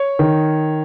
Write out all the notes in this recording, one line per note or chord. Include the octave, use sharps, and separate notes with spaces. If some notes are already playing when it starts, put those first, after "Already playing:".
Already playing: C#5
D#3